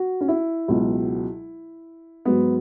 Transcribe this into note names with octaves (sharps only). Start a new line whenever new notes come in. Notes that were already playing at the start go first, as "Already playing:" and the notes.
Already playing: F#4
C#4
E4
C#2 B2 F#3
G#2 F#3 B3